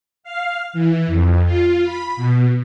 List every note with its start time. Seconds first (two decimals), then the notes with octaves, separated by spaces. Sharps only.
0.24 F5
0.73 E3
1.07 F2
1.45 F4
1.84 B5
2.17 B2